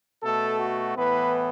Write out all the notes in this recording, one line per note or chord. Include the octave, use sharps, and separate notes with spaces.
B2 A3 A4
F#4
A2 E3 B3 B4